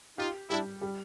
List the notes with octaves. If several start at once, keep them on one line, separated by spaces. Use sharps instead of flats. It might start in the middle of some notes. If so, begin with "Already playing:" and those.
D#4 F4 G4
G3 D4 E4
G3